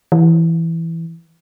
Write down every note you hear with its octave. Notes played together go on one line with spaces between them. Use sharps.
E3